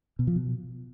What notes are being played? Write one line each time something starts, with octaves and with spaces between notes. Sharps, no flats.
B2
F3
B2